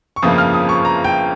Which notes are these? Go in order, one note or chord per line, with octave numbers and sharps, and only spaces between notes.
C#6
G1 F2 C#3 F3 A#3 D#6
F6
D#6
C#6
A#5
G5